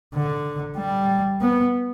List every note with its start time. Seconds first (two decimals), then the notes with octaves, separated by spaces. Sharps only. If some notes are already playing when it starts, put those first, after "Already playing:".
0.14 D3
0.77 G3
1.41 B3